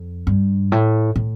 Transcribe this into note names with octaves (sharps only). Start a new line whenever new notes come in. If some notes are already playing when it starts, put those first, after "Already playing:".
Already playing: F2
G2
A2
A2